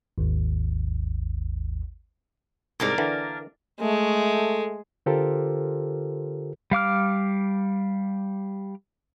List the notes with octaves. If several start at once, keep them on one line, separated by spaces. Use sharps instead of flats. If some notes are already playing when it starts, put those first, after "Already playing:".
G#1 D#2
C2 G#2 A#3 D4 A#4
D3 E3
G#3 A3
D3 F4 G4 A4 A#4 C5
G3 F5 D6 F6